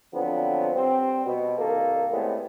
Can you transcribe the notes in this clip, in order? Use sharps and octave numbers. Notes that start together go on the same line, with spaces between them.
D3 F3 F#3 B3 C4
G3 C4
B2
C2 D#3 A#3 A4
A2 G3 G#3 B3 C4